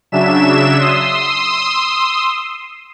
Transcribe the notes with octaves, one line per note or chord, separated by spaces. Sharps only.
C#3 F#3 D4 E5 E7
C6 D#6 E6